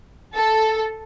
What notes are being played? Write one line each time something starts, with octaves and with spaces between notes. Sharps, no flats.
A4